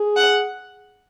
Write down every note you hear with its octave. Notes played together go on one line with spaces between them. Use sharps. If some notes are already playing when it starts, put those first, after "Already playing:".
Already playing: G#4
F#5